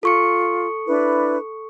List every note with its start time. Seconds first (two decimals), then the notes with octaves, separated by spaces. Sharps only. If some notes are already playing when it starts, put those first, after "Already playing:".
0.03 F4 A4 C#6 C#7
0.87 D4 E4 B4